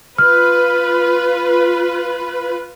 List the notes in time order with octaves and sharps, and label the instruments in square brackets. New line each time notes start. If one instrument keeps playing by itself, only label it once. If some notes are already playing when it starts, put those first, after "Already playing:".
[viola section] F4 B4 [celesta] F6